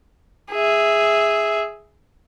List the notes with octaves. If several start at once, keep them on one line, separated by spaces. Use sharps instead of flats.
G#4 E5